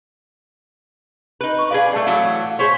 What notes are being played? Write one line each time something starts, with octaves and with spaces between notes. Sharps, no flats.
D#4 B4
C#6
G#4 B4 D5 F5
G3 A3
A2 E3 F#3
G#4 C5 C#5 B6